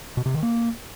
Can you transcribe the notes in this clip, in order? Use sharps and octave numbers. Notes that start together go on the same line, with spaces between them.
B2
C3
D#3
A#3